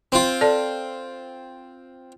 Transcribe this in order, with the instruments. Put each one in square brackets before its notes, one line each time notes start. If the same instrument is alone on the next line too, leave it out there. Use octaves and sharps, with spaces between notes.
[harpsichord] C4 F4
[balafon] A4 D5 A5